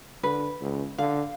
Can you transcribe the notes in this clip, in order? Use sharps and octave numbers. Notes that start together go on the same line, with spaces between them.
D3 B4
C#2
D3 F5